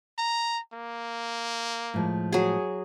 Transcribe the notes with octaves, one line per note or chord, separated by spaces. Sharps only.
A#5
A#3
A2 F3 G#3
F#3 G#4